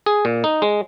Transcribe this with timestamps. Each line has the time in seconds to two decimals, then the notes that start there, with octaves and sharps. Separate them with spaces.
0.06 G#4
0.25 A#2
0.44 D#4
0.62 G#3